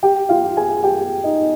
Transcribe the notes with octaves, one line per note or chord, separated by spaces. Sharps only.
G4 G5
F4 F5
G#4 G#5
G4 G5
D#4 D#5